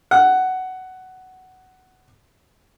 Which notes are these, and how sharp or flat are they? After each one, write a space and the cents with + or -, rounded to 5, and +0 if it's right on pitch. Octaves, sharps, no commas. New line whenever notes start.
F#5 +10